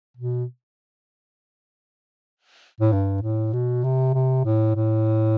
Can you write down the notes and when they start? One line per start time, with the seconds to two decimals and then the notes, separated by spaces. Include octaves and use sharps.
0.17 B2
2.80 A2
2.92 G2
3.22 A2
3.53 B2
3.84 C3
4.14 C3
4.45 A2
4.75 A2